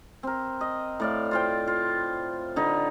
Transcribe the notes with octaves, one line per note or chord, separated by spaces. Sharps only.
C4 A#4
D#5
A2 D5 F5
F4 C5 G5
F4
D3 D#4 B4